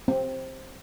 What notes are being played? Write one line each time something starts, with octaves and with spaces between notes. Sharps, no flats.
C4